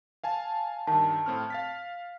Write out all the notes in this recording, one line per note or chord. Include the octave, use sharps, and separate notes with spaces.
F5 G#5 A5
G2 D#3 A5
A2 C4 F6
F5 A6 B6